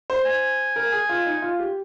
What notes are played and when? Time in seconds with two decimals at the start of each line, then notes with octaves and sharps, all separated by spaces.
0.10 C5
0.26 G#5
0.76 A#4
0.92 G#4
1.09 F4
1.26 D#4
1.42 F4
1.59 G4